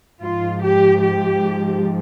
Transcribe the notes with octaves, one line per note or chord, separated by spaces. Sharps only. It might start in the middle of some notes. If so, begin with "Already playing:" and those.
G#2 F3 F4
G4
G4